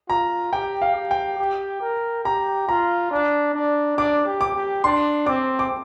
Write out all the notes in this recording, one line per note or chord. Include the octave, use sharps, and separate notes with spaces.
F4 A#5
G4 G5
F5
G4
G5
G4
A#4
G4 A#5
F4 A#5
D4
D4
D4 D6
G4
D6
G4
D4 C6
C4 D6
D6